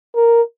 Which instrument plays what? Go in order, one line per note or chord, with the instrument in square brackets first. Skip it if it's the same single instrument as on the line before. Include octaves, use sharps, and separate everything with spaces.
[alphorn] A#4